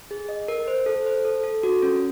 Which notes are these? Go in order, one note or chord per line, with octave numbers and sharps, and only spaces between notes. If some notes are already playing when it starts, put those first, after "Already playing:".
G#4
D#5
A#4
C5
A4
C5
A4
A4
F#4
C#4